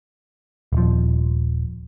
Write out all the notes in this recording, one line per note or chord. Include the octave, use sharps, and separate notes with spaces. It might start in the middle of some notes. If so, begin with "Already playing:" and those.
D#1 F3